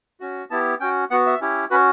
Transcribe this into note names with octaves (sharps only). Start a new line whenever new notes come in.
C#4 F#4
B3 E4 G4 A5
C#4 F#4 G5
B3 F#4 F#5
E5
C#4 E4 G4
C#4 F#4 B4